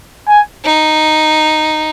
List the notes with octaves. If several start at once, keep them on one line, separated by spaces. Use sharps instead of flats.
G#5
D#4